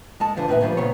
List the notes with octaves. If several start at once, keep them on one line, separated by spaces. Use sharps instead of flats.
G#3 A4 A5
D3 E3 F3
D#2 A2 C3 B4 E5 G#5
E3 F3 G3 A3 C#4
A#2 C#3 B3 C4 C#5